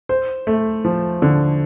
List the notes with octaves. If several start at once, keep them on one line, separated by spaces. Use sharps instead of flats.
C5
A3
F3
D3